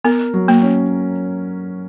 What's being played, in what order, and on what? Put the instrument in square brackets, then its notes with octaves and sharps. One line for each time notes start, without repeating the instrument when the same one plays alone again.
[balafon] B3 [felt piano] A#4
[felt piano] F#3
[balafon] A#3
[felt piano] C#4